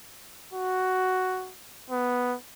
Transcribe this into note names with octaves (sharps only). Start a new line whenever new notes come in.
F#4
B3